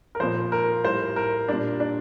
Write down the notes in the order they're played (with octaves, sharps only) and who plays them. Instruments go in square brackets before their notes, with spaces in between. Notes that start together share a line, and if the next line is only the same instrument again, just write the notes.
[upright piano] A#4
A#2 F3 C5
A#4
A2 G3 C5
A#4
A#2 G3 D4
D4